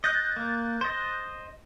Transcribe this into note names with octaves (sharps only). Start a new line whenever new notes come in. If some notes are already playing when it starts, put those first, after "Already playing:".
D#5 F#6 G6 A6
A#3
C5 D#5